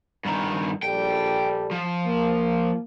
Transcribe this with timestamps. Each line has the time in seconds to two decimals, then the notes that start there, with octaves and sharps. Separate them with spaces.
0.25 G2 D#3
0.82 A#1 G3 A4 G5
1.71 F3
2.06 A#3